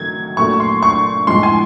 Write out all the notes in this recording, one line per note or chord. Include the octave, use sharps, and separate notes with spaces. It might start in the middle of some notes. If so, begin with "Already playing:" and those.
Already playing: D#3 F#3 A3 G#6
A#2 F#3 A3 C#6
C6
C#6
A2 F3 G#3 C6
G#5